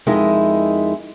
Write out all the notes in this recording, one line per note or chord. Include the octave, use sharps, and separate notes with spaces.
F2 G#3 D#4 E4 A#4